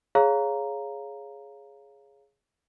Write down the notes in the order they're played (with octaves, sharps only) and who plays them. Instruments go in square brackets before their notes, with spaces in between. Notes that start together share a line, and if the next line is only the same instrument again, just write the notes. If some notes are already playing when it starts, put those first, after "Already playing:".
[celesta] G#4 C#5 F5 A#5